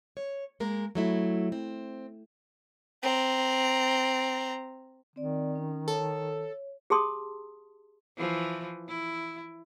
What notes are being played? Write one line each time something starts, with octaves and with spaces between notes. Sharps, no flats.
C#5
G#3 A#3 A#4
F#3 A3 E4
C4
C4 A#5
D#3 C4 D5
C#4
A4 C#5
G4 G#4 A5 C6 D#6
E3 F3
E4